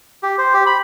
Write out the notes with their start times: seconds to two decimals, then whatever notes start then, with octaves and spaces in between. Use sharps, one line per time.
0.23 G4
0.38 C5
0.54 G4
0.66 B5